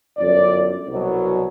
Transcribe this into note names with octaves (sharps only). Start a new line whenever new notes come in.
G1 F#2 D3 D5
C2 B2 F#3